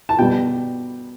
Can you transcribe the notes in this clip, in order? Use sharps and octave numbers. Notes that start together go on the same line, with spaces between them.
A5
B2 G3 G5